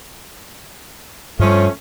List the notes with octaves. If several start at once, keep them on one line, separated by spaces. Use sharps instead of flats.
G2 F3 G3 A3 C#4